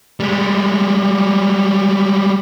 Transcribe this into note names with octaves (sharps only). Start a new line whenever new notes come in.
G3 G#3